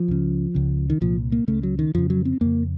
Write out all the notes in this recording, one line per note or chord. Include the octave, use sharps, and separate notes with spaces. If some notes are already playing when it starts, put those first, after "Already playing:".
Already playing: F3
C#2 C#3
C#2 C#3
D#3
C2 A#2 F3
A#3
C#2 C#3 A3
F#3
D#3
F2 C#3 F3
F#3
C4
F2 C#3 A#3